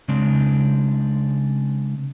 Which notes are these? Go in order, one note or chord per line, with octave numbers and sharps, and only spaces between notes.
C#3 G#3 C4 D4